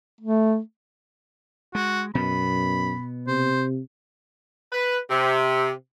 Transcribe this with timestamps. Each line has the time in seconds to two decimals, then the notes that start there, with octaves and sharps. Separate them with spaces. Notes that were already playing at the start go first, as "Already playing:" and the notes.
0.21 A3
1.75 G#3 F#4
2.15 F#2 B2 B3 B5
3.28 C3 C5
4.73 B4
5.11 C3